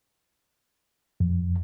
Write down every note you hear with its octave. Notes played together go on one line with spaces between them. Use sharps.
F2